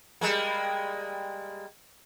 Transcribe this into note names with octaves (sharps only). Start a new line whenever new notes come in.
G3 G#3 A#3